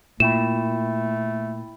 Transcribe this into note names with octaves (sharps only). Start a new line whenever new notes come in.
A#2 A3 E4 G5 B5 E7